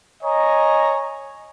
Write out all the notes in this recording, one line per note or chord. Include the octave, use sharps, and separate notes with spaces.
C#5 D#5 G#5 A#5